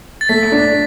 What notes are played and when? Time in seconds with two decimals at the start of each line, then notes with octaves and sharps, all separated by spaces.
0.21 A6
0.29 A3 B6
0.52 D4